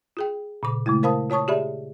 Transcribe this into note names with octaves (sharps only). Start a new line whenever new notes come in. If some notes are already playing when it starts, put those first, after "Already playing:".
F4 G#4 G5
A#2 C#3 D6
C#3 G#3 A3 E4
A#4 C5 F5 A5 B5 D#6
F4 C#5 A5 C#6 D#6
F4 G4 G#4 D5 E5 B5